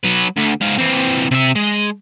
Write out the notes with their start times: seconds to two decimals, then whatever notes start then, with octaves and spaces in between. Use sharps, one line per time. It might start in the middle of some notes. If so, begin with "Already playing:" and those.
0.04 F#3 B4
0.37 D2 D3
0.61 G#2 F5
0.79 E3 C4
1.31 C3 E5
1.55 G#3